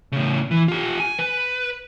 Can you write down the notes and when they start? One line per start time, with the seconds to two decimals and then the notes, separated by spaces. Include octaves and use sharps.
0.12 A2 C#3
0.51 E3
0.68 F4 G4
1.00 G#5
1.19 B4